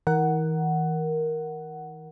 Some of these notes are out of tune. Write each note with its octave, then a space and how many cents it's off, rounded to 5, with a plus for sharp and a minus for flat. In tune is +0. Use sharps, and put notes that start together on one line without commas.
E3 -40 A#4 +5 F#5 +10